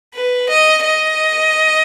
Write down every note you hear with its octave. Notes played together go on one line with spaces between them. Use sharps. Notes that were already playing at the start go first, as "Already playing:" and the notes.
B4
D#5
D#5